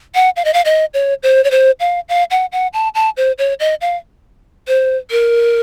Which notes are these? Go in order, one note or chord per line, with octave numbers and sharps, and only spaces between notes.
F#5
F5
D#5
F5
D#5
C#5
C5
C#5
C5
F5
F5
F#5
F#5
A5
A5
C5
C#5
D#5
F5
C5
A#4